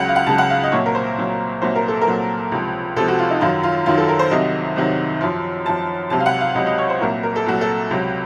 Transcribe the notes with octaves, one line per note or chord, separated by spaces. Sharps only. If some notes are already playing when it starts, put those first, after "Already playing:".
Already playing: C#2 C#3 F#3 F#5
F5
F#5
C#2 C#3 F#3 A5
F#5
F5
D#5
C2 A#2 F#3 C#5
A#4
C5
C2 A#2 F#3
C2 A#2 F#3 C5
A#4
A4
A#4
C2 A#2 F#3
C#2 C3 F3
C#2 C3 F3 A4
F#4
F4
D#4
F#2 D#3 F#3 F4
F4
F#2 D#3 F#3 F4
A4
A#4
C5
C2 C3 D#3 F#3 D#5
C2 C3 D#3 F#3
F#2 F3
F#2 F3 A5
C#2 C3 F#3 A5
F5
F#5
F5
C#2 C3 F#3 D#5
D#5
C#5
C5
C2 A#2 F#3 A#4
A#4
A4
C2 A#2 F#3 F#4
A4
C#2 C3 F#3